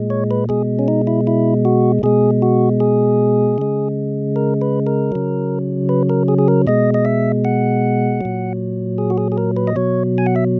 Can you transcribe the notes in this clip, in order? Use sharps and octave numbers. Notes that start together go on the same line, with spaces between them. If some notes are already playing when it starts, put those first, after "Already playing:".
Already playing: A#2 G#3
C#5
B4
B2 G#3 G#4
C#4
D#4
E4
E4
F#4
B2 G#3 G#4
F#4
G#4
C#3 G#3
A#4
B4
A#4
C#3 F#3
B4
A#4
G#4
G#4
A#4
B2 G#3 D#5
D#5
E5
F#5
A#2 F#3
G#4
F#4
G#4
G#4
A#4
B4
D#5
B2 F#3 C#5
G#5
F#5
E5